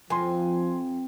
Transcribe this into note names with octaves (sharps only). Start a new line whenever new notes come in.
F2 F3 G#5 C6